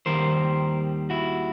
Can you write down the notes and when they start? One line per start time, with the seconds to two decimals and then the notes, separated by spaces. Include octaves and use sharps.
0.06 D#2 D#3 G3 A#4 C5
1.10 E4 F#4